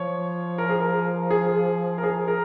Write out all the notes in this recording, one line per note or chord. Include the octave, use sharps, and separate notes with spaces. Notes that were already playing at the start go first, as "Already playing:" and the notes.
Already playing: F3 C#5
A#4
G#4
A#4
G#4
A#4
G#4
A#4